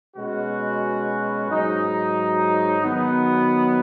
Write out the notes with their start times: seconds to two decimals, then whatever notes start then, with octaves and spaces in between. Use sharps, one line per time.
0.16 B2 G#3 C#4 F#4 B4
1.49 G#2 F#3 D#4
2.83 D#3 F#3 B3